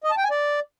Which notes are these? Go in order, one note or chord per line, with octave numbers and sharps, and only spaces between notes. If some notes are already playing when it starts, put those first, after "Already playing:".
D#5
A5
G5
G#5
D5